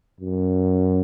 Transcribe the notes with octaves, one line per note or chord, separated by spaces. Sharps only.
F#2